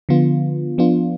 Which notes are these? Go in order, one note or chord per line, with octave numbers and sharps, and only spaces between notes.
D3 F3 B3 F4
F3 B3 D4 F4